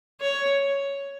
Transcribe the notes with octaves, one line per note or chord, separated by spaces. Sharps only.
C#5